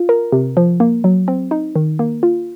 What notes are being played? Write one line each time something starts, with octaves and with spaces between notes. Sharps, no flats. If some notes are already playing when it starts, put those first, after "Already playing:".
Already playing: F4
A#4
C3
F3
A#3
F#3
C4
D#4
D#3
A#3
F4